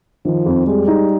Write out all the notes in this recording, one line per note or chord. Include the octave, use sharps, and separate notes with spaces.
D#3 F3
F2
G3 G#3
D#4